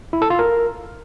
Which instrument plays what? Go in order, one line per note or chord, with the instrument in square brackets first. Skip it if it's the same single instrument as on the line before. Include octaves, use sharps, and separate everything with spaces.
[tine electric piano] E4
A4
F4
A#4